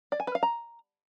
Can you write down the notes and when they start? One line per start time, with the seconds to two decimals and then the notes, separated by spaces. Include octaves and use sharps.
0.12 D5
0.20 G#5
0.27 B4
0.35 F5
0.43 A#5